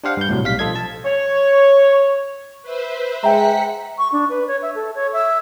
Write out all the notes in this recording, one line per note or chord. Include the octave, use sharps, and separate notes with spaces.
D4 G4 C5 F5 F#5
G2 G6
A2 C3 F#3
B1 G3 F5 B6
F3 F4 A4 D#5 G#6
A5
C#5
B4 C5 E5
G#3 E5 F#5 G5 A#5 B6 C#7
C#6
D4
B4
C#5
E5
A4
C#5
E5